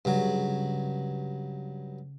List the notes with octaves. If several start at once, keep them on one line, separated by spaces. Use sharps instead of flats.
G2 C#3 F#3